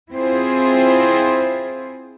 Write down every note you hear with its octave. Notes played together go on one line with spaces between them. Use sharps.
C4 E4 F4 G#4 C5